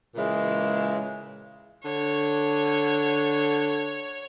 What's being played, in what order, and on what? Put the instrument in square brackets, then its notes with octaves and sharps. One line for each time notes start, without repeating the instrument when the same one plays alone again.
[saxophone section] A#2 C#3 E3 G#3
[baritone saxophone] D3 [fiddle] C#5